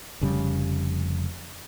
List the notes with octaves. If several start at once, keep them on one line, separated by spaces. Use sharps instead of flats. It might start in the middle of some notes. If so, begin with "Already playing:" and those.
F1 F2 C#3 G3